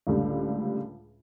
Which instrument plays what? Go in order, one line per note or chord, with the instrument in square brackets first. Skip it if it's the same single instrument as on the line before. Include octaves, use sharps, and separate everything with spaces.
[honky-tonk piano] C#2 A2 D3 G3